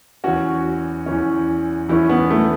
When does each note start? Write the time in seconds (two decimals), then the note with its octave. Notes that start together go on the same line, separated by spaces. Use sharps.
0.24 E2 E3 C#4 F#4
1.06 E2 E3 C#4
1.89 E2 E3 C#4 E4
2.09 B3
2.30 A3